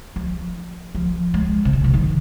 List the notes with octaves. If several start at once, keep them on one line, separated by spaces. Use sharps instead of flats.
F3
F3
G#3
C3
D#3
F3
D#3